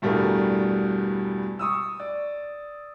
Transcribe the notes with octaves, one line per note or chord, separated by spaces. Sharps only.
E2 G2 B2 G3 A3 A#4
C#6 D#6 E6
D5